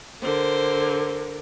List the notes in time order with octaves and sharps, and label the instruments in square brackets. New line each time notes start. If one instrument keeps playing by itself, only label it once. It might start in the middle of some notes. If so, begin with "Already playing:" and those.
[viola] D3 A#4 [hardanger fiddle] C5